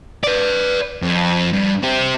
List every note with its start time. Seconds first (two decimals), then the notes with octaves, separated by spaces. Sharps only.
0.24 B4 D5
1.02 F2
1.53 G2
1.83 C4 G4